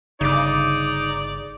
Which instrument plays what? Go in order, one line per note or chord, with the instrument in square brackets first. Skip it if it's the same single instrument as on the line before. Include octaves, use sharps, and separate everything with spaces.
[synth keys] G1 D6 [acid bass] C#3 [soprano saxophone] D#4 [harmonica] D5